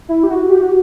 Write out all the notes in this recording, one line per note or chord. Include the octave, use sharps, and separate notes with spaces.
E4
G4
F#4
G4
F#4